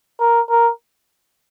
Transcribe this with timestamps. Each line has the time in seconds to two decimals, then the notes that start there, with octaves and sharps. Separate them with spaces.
0.20 A#4
0.50 A#4